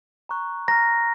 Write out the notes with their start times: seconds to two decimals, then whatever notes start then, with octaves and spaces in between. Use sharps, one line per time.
0.29 A#5 C#6 F#6
0.68 A#5 F6 A#6